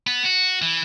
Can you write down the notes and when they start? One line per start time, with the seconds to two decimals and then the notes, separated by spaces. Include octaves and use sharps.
0.07 B3
0.25 F#4
0.62 E3